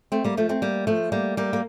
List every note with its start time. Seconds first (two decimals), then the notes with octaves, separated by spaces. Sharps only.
0.12 A3 C4
0.24 G3 A#3
0.37 F3 A3
0.49 A3 C4
0.62 G3 A#3
0.87 F3 A3
1.12 G3 A#3
1.37 G3 A#3
1.53 A#3